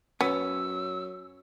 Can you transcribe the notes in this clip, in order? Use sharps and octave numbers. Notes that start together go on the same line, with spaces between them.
F#2 B3 C#4 E6